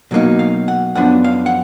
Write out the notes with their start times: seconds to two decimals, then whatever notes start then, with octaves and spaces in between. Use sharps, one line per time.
0.11 B2 F#3 A#3 D#4
0.39 F5
0.68 F#5
0.95 F#2 F3 B3 D4 F#5
1.24 F5
1.46 F#5